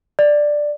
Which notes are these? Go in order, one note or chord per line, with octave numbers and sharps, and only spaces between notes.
D5